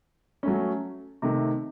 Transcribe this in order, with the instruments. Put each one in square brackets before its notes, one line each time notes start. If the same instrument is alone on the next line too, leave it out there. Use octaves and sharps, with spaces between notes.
[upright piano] F#3 A3 C#4
C3 D#3 A3